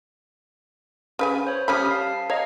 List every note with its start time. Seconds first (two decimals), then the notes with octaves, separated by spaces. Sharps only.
1.19 C#3 B4 G#5
1.47 C5 C#5
1.68 G3 C#4 B5 D#6 F6 B6
1.91 F5 A5
2.30 C#5 D#5 F5 A#5